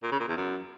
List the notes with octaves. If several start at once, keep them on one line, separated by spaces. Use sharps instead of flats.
A#2
C#3
A#2
E2
F#2